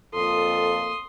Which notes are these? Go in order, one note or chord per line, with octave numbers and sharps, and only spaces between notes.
F2 A#2 F4 A4 C6 D#6